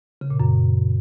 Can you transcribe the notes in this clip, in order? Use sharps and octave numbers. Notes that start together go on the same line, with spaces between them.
C#3
A#2
F#2